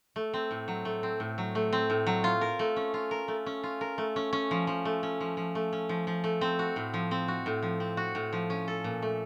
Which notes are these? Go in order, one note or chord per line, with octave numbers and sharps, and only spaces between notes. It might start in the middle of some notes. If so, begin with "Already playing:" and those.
A3
C4
A2
F#3
A3
C4
A2
F#3
A3
C4
A2
F#3
F4
A#4
A3
C#4
F4
A#4
A3
C#4
F4
A#4
A3
C#4
C#4
F3
F3
A3
C#4
F3
F3
A3
C#4
F3
F3
A3
C4
F#4
A2
F3
C4
F#4
A2
F3
C4
F#4
A2
F3
C#4
A4
A#2
A3